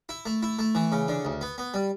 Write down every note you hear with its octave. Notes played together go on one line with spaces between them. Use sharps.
E4
A3
E4
A3
E3
C#3
D3
D2
B3
B3
G3